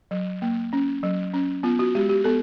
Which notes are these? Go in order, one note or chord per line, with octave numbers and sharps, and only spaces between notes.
F#3
A#3
C#4
F#3
C#4
B3 F4
F#4
G#3 G4
G4
B3 A4